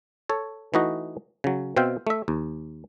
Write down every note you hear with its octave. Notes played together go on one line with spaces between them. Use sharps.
A4 C#5
E3 A3 D#4 F#4 D#5
C#3 F#3
B2 C4 E5 F5 G5
A3 E5
D#2